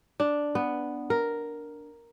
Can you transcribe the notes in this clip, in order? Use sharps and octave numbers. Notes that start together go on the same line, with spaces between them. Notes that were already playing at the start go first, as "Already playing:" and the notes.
D4
B3
A#4